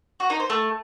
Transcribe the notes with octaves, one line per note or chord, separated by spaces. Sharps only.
F#4
D#4
C5
A3